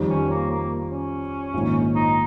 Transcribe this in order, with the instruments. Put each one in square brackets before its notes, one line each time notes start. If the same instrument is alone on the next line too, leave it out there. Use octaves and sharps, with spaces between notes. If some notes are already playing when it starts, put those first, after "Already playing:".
Already playing: [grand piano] F2 D#3 G3
[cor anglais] C#4
A#3
A#3
C#4
[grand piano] A#1 G#2 D#3
[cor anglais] D#4